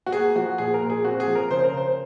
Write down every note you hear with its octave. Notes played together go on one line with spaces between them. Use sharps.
F#4
A#3 G#4
F3 F#4
A#2 G#4
A#4
A#2
G#4
C4 F#4
G#4
F3
A#4
C#3 C5
A#4
C#3 C5